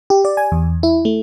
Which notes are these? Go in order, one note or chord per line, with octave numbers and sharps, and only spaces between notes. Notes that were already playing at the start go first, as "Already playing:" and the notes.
G4
D5
G#5
E2
E4
A3